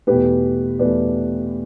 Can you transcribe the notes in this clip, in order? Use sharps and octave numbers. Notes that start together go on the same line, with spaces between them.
E2 B2 A3 G4 B4
E2 B2 A3 B4 D5